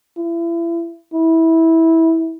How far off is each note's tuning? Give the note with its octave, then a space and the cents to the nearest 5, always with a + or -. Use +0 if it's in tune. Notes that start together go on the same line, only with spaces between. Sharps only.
E4 +35
E4 -15